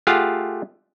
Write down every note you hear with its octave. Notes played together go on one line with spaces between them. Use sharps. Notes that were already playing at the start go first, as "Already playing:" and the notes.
A3 F4 G4 G#4 F5 F#5